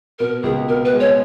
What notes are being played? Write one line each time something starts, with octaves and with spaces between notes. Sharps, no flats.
B2 A#4
C#2 G#4
B2 A#4
B4
G#3
C#5